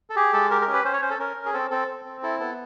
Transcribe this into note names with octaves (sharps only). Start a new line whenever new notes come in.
A4
G4 G#4
G#3 A4
G4 A#4
A#4
C#4
B4
C#4 C5
C#5
C#4 C5
A4
C#4 A#4
C#4
G#4
C4 A4
C4 A4
C4
C4
E4 A4
B3 A4